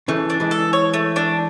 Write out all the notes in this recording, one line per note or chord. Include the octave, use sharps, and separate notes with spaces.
C#3 E3 A3
D4
E3 G#3
A4
C#5
A3
D4